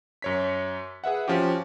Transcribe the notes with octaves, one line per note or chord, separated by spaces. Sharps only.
F#2 C#5 B6
G#4 B4 E5 F#5
F3 C#4 F#4 G4